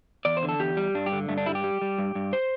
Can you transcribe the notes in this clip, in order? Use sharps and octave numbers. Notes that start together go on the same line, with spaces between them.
E2 D5
C5
D3
A4
E2 G4
G3
G2 D4
G4
D3
G2 A3
D4
G3 E4
G4
G3
G3
G2
G2
C5